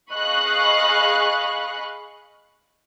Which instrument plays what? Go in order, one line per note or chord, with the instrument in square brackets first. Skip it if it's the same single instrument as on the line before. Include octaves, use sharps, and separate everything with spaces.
[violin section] G#4 D#5 F5 B5 C#6 F#6